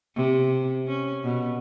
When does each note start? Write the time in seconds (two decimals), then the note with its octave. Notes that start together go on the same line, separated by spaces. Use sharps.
0.16 C3
0.87 C#4
1.24 B2